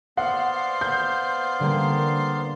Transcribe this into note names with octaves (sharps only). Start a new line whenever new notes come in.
B3 C5 D5 F5 F#5
G6
D3 G3 A#3